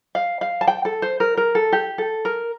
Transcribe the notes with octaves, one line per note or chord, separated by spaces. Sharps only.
F5
F5
A5
G5
A4
C5
A#4
A#4
A4
G4
A4
A#4